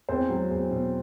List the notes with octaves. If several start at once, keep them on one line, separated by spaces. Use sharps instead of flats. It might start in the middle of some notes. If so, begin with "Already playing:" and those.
E2 C4 C5
F#3
E2
B2